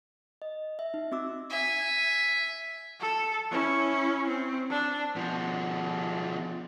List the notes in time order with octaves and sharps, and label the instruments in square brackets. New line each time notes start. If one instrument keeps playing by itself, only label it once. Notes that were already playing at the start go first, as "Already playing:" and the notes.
[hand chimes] D#5
E5
D#4
C4 F#4 D6 E6
[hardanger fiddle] E5 G#5
[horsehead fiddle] A4
C#4 E4
C4
D4
[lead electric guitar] B2 F3